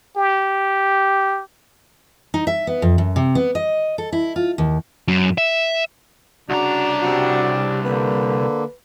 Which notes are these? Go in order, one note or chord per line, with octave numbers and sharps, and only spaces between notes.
G4
D#4
E5
B3
F2
F#2
C3
B3
D#5
A4
E4
F4
D#2
F#2
E5
C2 C#3 D4 F#4 A#5
G3 C4 F#4
D3 A#3 B4